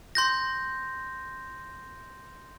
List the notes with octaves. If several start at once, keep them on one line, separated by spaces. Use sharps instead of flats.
C6 G6 A#6